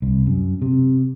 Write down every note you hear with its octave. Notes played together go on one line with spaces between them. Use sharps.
C2
F#2
C3